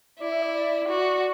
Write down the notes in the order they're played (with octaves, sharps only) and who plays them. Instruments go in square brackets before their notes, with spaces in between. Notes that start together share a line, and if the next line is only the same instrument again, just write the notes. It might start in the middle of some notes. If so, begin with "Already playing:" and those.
[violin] E4 [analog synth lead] D5
[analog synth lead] E5
D5
D5
[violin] F#4